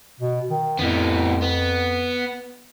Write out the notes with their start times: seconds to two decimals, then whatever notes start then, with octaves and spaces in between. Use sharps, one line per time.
0.20 B2
0.50 D#3
0.79 F2 A2 B3
1.42 B3